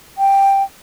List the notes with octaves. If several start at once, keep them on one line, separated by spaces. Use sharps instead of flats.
G5